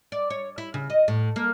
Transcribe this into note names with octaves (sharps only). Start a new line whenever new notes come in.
D5
C#5
E4
C#3
D#5
A2
A#3